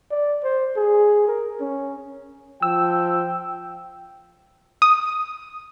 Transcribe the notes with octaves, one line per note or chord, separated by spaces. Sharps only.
D5
C5
G#4
A#4
C#4
F3 G5 E6
D#6